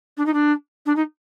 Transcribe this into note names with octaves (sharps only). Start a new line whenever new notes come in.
D4
D#4
D4
D4
D#4